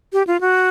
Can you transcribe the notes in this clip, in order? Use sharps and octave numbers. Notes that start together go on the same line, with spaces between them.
G4
F4
F#4